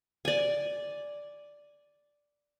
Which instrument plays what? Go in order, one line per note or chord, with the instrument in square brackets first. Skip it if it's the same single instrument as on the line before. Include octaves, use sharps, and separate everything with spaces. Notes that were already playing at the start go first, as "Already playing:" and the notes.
[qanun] D5 G#5